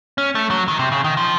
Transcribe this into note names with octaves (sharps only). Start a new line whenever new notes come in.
C#4
A3
F#3
D#3
C3
C#3
D#3
F3